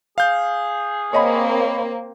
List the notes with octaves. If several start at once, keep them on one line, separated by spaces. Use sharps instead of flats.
G#4 F5 G6
A#3 C4 C#5 D#5 B5